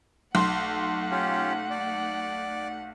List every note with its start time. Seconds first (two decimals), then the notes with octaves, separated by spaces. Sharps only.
0.35 B1 A3 F#5 C6
1.11 C#4 F4 G4
1.71 D5